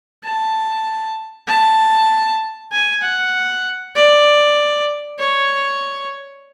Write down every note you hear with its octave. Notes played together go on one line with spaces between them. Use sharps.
A5
A5
G#5
F#5
D5
C#5